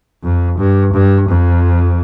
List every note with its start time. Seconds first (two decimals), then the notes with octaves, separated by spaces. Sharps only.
0.23 F2
0.58 G2
0.93 G2
1.28 F2